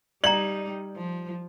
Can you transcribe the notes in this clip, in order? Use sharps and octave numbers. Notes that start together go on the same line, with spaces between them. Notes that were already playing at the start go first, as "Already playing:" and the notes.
G3 D#4 D5 G5 A#5 F#7
F3